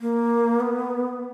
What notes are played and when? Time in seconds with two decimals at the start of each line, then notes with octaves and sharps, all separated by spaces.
0.01 A#3
0.60 B3